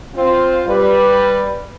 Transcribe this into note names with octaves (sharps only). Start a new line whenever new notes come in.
C4 F4
G3 B4